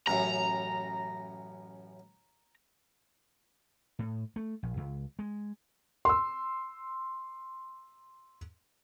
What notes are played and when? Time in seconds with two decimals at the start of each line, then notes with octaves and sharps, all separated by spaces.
0.07 A1 F#2 A2 A#5
3.99 A2
4.36 A3
4.63 A#1
4.77 C#2
5.19 G#3
6.05 C6 E6